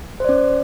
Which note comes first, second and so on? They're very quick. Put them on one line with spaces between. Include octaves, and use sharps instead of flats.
C5 D5 C#4